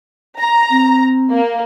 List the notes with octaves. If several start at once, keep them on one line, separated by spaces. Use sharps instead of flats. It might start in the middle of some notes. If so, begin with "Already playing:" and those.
A#5
C4
A#3